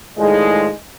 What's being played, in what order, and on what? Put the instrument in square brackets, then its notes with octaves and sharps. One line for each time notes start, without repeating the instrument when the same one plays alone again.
[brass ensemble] A2 D#3 F3 G3 G#3